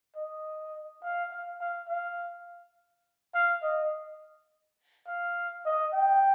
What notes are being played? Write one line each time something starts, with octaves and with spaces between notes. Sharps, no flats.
D#5
F5
F5
F5
F5
F5
D#5
F5
D#5
G5